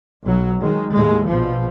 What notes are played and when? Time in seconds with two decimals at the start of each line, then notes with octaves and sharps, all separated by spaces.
0.23 B1 F#3
0.61 D#3 G#3
0.92 D#2 A2 G#3
1.27 A#1 B2 F3